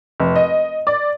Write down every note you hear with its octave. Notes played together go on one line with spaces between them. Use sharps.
F1
D#5
D5